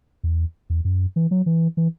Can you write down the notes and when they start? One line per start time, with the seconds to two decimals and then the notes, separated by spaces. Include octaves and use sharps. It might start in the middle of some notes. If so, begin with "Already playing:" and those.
0.24 E2
0.70 E2
0.85 F#2
1.16 E3
1.31 F#3
1.46 E3
1.77 E3